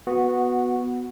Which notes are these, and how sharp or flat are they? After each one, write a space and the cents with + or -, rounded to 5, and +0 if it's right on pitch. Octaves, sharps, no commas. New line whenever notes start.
B3 +0 F#4 -10